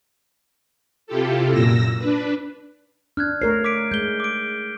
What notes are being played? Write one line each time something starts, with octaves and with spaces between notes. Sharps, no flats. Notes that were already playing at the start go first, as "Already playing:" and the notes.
C3 E4 F4 G4 A4
F#2 A#2 E6 A#6
D4 B4
D4 F6 F#6 G#6
A3 A#4 C#5 C7
D6 B6 D7
G#3 G6 G7
D6 D7